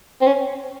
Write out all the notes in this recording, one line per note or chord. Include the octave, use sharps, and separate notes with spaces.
C4
C#4